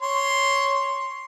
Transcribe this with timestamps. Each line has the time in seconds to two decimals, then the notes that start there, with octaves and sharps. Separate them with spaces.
0.02 C#5 C6